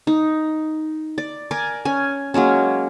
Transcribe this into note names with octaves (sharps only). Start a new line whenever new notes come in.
D#4
D5
A#4 D5 G#5
C#4 G#5
F#3 G#3 A#3 C#4